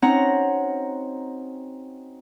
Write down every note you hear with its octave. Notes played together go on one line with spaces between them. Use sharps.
C4 C#4 D#4 F#4 F#5 A#5